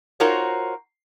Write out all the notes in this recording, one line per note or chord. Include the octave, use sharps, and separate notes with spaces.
D#4 F4 F#4 A#4 C5 C#5